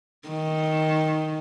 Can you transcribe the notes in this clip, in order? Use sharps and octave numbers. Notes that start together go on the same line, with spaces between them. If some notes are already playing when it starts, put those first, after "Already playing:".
D#3